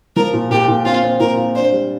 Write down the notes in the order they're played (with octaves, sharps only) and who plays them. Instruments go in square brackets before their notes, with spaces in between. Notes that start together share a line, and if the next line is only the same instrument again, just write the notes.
[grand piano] F3 [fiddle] A#4
[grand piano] A#2
[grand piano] A#2 [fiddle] G4
[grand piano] A#2
[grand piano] C4 [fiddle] F4
[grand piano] C4
[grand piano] A#2 [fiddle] A#4
[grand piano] F4
[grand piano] D4 [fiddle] C5
[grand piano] G3